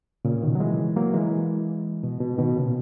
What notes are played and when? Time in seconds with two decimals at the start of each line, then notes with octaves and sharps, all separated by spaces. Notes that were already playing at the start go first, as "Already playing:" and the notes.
0.25 A#2 C#3
0.42 B2 D#3
0.55 F#3
0.60 E3 G#3
0.96 F#3 A#3
1.14 E3 G#3
2.03 B2
2.21 B2
2.38 B2 D#3
2.56 A#2 C#3